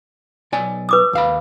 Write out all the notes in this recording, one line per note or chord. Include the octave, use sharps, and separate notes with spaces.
B1 D5 G#5
B4 D6 D#6
D#2 F5 B5